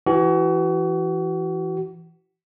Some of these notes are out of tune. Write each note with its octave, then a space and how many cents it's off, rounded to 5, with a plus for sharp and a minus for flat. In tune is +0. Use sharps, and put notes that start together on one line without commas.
E3 +10 F#4 +35